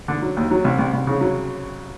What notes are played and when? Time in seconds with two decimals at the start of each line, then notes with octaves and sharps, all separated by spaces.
0.08 D3
0.22 F#3
0.37 D#2
0.51 F#3
0.64 C2
0.78 C2
0.93 C2
1.07 C#3
1.21 F#3